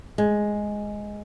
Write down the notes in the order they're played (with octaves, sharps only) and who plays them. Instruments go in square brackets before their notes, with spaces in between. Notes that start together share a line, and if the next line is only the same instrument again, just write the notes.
[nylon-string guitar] G#3